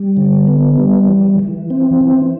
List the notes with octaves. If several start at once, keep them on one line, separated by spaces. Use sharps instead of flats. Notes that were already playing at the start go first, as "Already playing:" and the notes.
Already playing: G3
D3
B3
G3
E3
E3
C4
E3